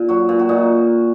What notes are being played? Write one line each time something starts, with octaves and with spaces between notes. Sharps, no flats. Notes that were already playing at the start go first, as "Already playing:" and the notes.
Already playing: A#2
F#3 F#4
A#2
F#4
A#2 D#4